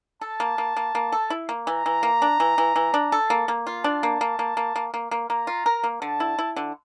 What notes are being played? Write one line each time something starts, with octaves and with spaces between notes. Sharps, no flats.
A4 A5
A#3
A#3
A#3
A#3
A4
E4
A#3
E3 A#5
E3
A#3
D4
E3
E3
E3
D4
A4
A#3
A#3
F4
D4 A5
A#3
A#3
A#3
A#3
A#3
A#3
A#3
A#3 A#5
F4
A#4
A#3
D3 A5
E4
E4
D3